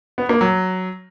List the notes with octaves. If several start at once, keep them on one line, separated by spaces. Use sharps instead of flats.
B3
A#3
F#3